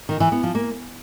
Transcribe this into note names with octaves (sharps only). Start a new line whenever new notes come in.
D#3
E3
B3
F3
A#3